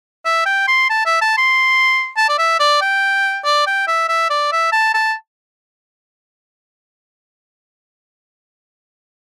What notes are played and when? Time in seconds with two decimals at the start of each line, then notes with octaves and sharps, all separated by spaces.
0.25 E5
0.45 G5
0.67 C6
0.89 A5
1.05 E5
1.21 A5
1.37 C6
2.17 A5
2.29 D5
2.38 E5
2.59 D5
2.81 G5
3.44 D5
3.67 G5
3.87 E5
4.08 E5
4.30 D5
4.52 E5
4.72 A5
4.94 A5